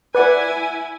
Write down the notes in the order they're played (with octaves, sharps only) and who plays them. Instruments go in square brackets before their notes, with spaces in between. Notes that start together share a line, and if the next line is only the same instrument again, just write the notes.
[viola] E4 G#5 [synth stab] B4 D5 F#5